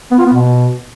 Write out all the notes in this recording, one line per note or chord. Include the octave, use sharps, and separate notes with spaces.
B3
F4
B3
B2